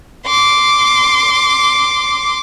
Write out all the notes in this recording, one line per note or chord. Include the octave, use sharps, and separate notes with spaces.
C6 D6